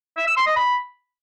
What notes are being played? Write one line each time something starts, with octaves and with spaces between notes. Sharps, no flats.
E5
E6
C6
D#5
B5